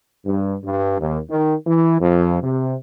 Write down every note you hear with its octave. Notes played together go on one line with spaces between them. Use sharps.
G2
G2
D#2
D#3
E3
F2
C3